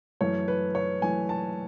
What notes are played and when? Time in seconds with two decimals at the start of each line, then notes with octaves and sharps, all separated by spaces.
0.21 F#2 E3 A3 C#5
0.48 B4
0.75 C#5
1.02 F#2 E3 A3 G#5
1.29 A5